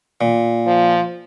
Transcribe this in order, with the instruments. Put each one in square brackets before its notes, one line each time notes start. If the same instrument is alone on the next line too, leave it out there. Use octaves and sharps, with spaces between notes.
[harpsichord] A#2
[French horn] F3